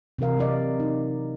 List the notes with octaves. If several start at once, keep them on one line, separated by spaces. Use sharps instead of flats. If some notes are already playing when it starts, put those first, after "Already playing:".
C3 E3 F#4 A#4 F5
F#3 C4 A#4 D5 D#5
D#4